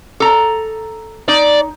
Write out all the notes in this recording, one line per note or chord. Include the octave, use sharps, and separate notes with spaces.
A4 A#5
D#4 D5